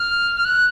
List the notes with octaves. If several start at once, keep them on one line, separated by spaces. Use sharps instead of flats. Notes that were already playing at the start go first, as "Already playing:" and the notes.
Already playing: F6
F6
F#6